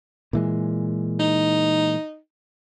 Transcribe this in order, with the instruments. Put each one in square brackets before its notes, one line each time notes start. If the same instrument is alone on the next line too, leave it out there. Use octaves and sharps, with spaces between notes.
[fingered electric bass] A#2 E3 G#3
[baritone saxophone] D#4